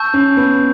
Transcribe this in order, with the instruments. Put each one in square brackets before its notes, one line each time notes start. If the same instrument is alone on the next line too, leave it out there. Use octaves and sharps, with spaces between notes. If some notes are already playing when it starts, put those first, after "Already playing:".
Already playing: [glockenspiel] A5 C#6 E6 G6
[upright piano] C#4
B3